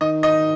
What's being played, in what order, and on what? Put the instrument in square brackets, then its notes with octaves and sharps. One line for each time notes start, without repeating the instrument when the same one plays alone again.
[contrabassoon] D#3 [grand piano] D#5
[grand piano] D#5